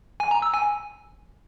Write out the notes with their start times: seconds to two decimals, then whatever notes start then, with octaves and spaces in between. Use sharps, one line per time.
0.20 G#5
0.31 A#5
0.42 E6
0.54 G#5